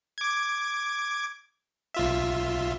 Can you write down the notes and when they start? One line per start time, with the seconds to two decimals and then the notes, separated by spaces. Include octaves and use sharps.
0.18 D6 G#6
1.94 B1 F4 E5